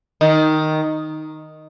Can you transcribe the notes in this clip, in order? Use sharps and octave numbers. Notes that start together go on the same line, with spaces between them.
D#3